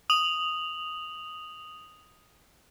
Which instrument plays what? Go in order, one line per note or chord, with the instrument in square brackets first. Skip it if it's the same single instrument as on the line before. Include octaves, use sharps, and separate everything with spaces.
[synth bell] D#6 F7 F#7